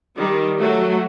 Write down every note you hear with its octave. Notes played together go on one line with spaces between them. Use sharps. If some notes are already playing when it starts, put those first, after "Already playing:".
D#3 G3
F#3 A3 F#4